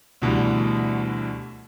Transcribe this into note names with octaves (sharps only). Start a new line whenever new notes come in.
D2 B2 D3 E3 G3